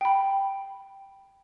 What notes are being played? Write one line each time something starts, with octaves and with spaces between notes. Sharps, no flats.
G5 B5